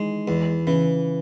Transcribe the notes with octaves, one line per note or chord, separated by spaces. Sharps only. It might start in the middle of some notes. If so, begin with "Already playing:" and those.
Already playing: D#3 E3 G#3
E2 E3
C#3 E3